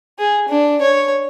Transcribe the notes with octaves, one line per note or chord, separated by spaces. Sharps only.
G#4
D4
C#5